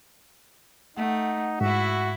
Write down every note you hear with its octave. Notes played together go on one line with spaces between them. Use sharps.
A3 D#4 F#5
G#2 E4 F#4 E5